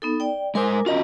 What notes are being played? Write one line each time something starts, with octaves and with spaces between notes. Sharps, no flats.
B3 D#4 A4
D5 G5
G#3 A#4 C5 G#5 D6
C#4 F4 F#4 D#5 A#5